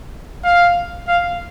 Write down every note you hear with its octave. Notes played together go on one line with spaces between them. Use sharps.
F5
F5